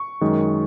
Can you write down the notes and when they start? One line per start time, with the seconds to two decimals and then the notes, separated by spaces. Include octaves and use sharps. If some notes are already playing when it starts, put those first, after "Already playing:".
Already playing: C#6
0.21 F#2 D#3 G#3